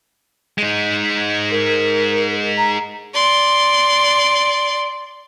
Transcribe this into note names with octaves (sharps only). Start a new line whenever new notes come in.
G#3 D#4
A#4
A#5
D5 C6